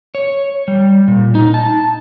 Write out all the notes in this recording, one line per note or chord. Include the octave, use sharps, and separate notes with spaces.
C#5
G3
A#2
D#4
A5